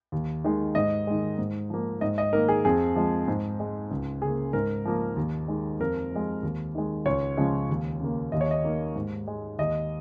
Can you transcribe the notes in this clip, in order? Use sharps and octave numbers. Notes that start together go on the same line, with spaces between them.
D#2
D#3 G#3
G#2 D#5
D#3 G#3
G#2
F3 A#3
G#2 D#5
D#5
D#3 A#3 A#4
G#4
F2 G#4
F3 G#3
G#2
G#3
C#2
C#3 A#3 G#4
G#2 A#4
F3 A#3
D#2
D#3 G#3
F2 A#4
F3 G#3
D#2
D#3 G#3
C#2 C#5
C#3 F3 G#3
D#2
C#3 A#3
D#2 D#5
C#5
D#5
D#3 A#3
G#2
G#3
D#2 D#5